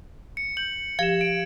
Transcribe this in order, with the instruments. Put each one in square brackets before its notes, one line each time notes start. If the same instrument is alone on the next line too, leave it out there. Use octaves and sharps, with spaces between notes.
[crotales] C#7
[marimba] G6 [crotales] F#7
[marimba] F3 G4 [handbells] F5 [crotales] G#6 E7
[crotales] D7